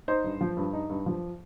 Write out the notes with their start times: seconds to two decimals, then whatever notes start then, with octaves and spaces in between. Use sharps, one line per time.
0.08 D#4 C5
0.24 G2
0.41 F3
0.57 G2
0.73 D#4
0.90 G2
1.06 F3